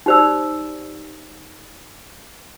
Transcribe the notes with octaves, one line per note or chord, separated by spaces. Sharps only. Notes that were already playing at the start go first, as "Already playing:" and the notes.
D#4 G4 C5 D5 E6